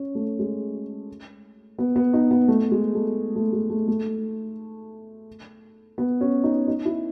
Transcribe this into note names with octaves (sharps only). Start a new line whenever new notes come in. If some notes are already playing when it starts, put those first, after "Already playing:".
Already playing: C#4
A3
G#3
B3
B3
D#4
B3
A3
G#3
A3
A3
G#3
A3
A3
B3
C#4
D#4
D#4
E4